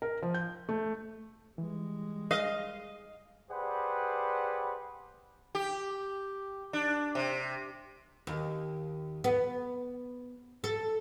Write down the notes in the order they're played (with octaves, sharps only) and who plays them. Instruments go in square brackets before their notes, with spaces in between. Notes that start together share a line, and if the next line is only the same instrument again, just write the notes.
[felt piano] A#4
F3
G6
A3
[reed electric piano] E3 [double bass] G3 G#3
[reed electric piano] G#4 [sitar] D#5 [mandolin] F5
[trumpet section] G4 G#4 B4 C5 D5 F#5
[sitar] G4
D4
C3
[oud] D#2
B3
A4